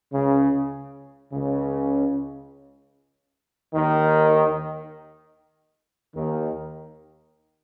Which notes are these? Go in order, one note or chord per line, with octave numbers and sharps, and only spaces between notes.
C#2 C#3
C#2 C#3
D#2 D#3
D#2 D#3